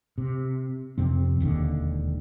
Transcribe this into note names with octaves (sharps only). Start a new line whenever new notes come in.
C3
F2 C3 C4
E1 D#2 D3